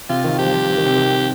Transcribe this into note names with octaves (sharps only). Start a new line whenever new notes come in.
C3 F4
D#3
F3 G4
G3
F3
F3
D#3
C3
D#3